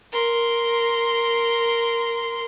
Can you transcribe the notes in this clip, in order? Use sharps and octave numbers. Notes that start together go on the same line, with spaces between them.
A#4 C6